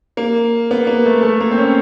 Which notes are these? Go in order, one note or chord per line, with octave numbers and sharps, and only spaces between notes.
A#3
B3
A#3
A3
A3
A#3
C4
C#4